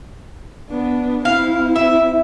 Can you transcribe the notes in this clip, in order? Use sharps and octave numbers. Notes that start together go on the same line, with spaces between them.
B3 D4
C4 E4 F5
E5